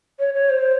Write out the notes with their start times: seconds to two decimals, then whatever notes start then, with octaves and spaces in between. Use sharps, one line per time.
0.19 C#5
0.34 C#5
0.50 C5